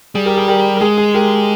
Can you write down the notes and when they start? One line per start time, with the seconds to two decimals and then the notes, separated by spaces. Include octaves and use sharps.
0.15 G3 G#4
0.26 G4 A#4
0.37 G#4
0.48 G4 A#4
0.77 A#4
0.81 G#3 G#4
0.98 G#4
1.14 G4 A#4